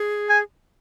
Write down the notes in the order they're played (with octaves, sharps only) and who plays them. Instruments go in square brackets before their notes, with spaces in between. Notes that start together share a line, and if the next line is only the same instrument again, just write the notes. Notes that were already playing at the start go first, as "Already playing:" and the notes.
Already playing: [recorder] G#4
[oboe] G#5